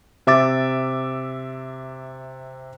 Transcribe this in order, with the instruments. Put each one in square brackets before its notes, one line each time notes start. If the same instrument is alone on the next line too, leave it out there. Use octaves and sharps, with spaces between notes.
[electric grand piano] C3 E5 D6 A6